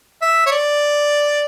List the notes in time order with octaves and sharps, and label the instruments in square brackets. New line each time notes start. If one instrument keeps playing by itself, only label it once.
[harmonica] E5
C#5
D5